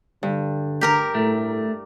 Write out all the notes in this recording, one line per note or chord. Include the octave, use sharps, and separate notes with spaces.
G2 D3
G4 A#4 A#5
A2 A3